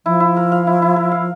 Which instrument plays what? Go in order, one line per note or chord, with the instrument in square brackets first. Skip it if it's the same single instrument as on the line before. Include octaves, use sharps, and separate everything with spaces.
[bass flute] F3 [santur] E4
[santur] E4
A#4
F5
E4
E4
A#4
F5